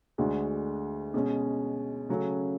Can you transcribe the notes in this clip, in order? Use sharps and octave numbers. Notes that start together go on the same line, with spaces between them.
D2 D3 G#3 D4 F#4
B2 G#3 C#4
C#3 F#3 A3 C#4